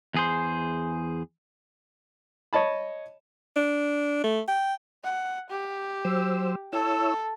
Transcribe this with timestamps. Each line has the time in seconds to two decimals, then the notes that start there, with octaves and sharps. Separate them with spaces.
0.14 E2 G#4 C5
2.53 C#5 D#5 A5 B5
3.56 D4
4.24 A3
4.48 G5
5.04 F#5
5.50 G4
6.05 F#3 C5 E6
6.73 E4 A4 C#5 E6